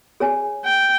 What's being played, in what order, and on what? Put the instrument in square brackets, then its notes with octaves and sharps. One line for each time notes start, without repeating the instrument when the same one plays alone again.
[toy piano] G#4 C#5 G#5
[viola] G5